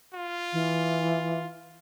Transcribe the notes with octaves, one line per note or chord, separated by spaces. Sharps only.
F4
E3